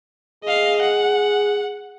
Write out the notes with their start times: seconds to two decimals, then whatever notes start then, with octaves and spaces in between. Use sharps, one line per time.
0.44 G#4 D#5 F5
0.82 F#5